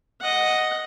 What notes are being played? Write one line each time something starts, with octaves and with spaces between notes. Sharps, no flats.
D#5 F#5